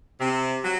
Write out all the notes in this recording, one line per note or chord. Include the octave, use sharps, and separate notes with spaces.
C3
F#3